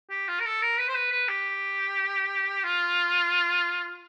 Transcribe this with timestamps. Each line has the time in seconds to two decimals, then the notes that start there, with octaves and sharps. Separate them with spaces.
0.10 G4
0.28 F4
0.40 A#4
0.45 A4
0.61 A#4
0.78 B4
0.88 C5
0.95 B4
1.11 B4
1.28 G4
2.64 F4